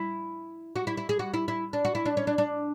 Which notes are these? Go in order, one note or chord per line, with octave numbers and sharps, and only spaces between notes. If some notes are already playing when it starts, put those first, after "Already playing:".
Already playing: E4
F#4
E4
E4
G#4
F#4
E4
E4
D4
F#4
E4
D4
C#4
D4
D4